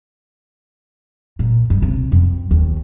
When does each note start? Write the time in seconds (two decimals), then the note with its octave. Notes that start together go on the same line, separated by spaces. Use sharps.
1.39 A#2
1.70 G2
1.82 C3
2.12 F2
2.51 D#2